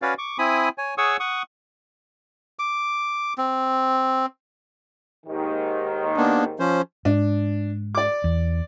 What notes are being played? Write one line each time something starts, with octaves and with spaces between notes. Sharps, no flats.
C#4 F#4 B4 C#5 D5 F5
C#6 D6
C4 E4 G#5 B5 D#6
C#5 G#5
G#4 C#5 F#5 C#6 D#6 E6
F#5 C#6 D#6
D6
C4
D#2 G#2 D#3
A#3 B3 D4
F3 C#4 C5
G#2 D4
D5 D6
E2